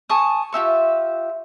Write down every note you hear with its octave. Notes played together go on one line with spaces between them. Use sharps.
G#5 A5 C#6 D#6
F4 G4 E5 C#6